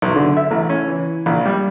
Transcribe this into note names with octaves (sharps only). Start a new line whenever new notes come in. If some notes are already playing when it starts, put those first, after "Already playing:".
B1
D3
E5
A1
C#4
E3
A#1
G3